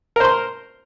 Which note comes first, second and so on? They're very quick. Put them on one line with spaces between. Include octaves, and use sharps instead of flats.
A#4 C5 C6